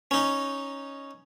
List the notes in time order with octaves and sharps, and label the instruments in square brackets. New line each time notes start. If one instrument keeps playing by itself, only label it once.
[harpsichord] C#4 D#4